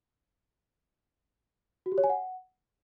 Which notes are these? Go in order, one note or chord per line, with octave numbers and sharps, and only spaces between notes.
F#4
G4
C#5
G#5
F#5